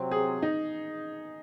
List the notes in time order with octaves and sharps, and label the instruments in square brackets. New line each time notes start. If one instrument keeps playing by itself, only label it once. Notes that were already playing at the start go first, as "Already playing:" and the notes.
Already playing: [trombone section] C3 F#3 C4
[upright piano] G#4
D#4